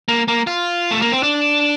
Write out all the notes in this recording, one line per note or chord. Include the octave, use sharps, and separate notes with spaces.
A#3
A#3
F4
A3
A#3
C4
D4